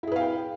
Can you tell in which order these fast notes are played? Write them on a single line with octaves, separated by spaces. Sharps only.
E4 G#4 B4 F5 G5